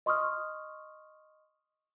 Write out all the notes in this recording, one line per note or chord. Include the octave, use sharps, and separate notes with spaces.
D#5 C6 C#6 D#6 F6